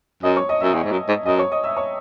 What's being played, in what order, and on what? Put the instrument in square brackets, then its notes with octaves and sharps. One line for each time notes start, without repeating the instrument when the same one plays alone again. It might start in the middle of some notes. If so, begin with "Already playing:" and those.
[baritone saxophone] F#2 [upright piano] D#5 D#6
[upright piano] C#5 C#6
D#5 D#6
[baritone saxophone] F#2 [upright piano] E5 E6
[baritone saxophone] E2
G#2
F#2
G#2
[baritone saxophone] F#2 [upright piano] D#5 D#6
[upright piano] C#5 C#6
D#5 D#6
E5 E6
C#5 C#6